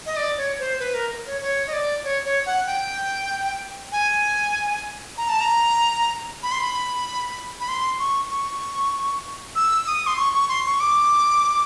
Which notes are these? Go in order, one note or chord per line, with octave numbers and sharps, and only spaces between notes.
D#5
D5
C#5
C5
B4
A#4
C#5
C#5
D#5
D5
C#5
C#5
F#5
G5
G#5
A#5
A5
A#5
B5
C6
B5
B5
C6
C#6
C#6
E6
D#6
C6
C#6
C#6
C6
C#6
D6